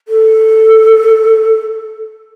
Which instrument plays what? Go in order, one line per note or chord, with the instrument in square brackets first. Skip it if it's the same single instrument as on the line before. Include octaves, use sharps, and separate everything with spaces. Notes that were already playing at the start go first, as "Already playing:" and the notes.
[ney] A4